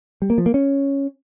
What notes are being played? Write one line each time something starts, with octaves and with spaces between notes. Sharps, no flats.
G3
A#3
F3
A#3
C#4